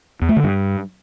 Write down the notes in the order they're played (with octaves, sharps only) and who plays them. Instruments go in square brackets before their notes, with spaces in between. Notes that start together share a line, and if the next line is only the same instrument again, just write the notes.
[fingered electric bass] E2
A3
D3
G2